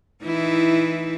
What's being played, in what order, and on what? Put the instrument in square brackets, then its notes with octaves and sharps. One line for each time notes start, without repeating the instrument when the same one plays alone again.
[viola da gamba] E3 D#4 E4